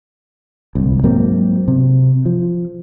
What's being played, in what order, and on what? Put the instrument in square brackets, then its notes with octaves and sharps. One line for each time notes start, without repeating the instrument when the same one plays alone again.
[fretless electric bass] D1 C2
G#2 F#3 A#3 C4
C3
F3